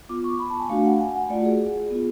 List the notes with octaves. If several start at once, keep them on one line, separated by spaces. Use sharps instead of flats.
B3 F4 D6
C#6
B5
A5
G#5
A3 D4 F#4 F5
F#5
G#5
F#5
A3 F4 D5
F#4
G#4
B3 F4